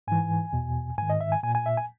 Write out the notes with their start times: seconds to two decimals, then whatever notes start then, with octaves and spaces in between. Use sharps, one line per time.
0.08 G#2 E3 G#5
0.53 E2 B2
0.98 G#2 D#3 G#5
1.10 D#5
1.21 E5
1.32 G#5
1.43 A#2 G#5
1.55 G#5
1.66 E5
1.77 G#5